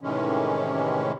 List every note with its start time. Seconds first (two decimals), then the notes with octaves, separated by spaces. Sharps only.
0.01 A2 C3 D#3 E3 G#3 C#4